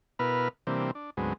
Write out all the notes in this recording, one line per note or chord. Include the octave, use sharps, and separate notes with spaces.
B2 B3 E4 A#4 B4 F6
C3 E3 G3 A#3 C4 D4
D4
D2 G#2 F#3 G#3 B3 C4